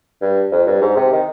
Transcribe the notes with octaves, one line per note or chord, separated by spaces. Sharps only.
G2
F2
G2
G#2
C3
D#3